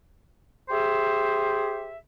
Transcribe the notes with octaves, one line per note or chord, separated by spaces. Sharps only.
G4 G#4 C5 E5